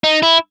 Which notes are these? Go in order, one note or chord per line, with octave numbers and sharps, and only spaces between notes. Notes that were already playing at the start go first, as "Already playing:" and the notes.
D#4
E4